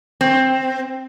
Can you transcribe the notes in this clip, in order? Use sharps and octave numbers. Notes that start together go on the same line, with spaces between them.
C4